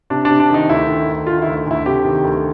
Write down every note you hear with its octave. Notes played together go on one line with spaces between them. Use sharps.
C3 D4
C3 D4
D4
D#3 D#4
D2 E4
D#3
D2
D#3 F4
D2 E4
D2 E4
C3 G4
D#3
D2